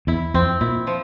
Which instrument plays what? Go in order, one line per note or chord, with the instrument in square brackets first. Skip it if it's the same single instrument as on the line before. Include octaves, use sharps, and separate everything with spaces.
[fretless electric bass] E2 [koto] E4
[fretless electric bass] F2 [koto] C4
[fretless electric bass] A#2 [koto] E4
[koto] F3